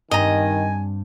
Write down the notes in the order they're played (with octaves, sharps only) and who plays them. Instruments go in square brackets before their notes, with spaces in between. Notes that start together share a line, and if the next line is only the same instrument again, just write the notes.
[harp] G2 C4 D4 [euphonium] D#3 [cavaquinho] D#5 A#5 [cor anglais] G#5